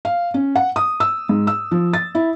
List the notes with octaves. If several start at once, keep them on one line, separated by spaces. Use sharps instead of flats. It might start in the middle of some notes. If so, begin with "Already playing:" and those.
F5
C#4
F#5
D#6
E6
G#2
E6
F3
A6
E4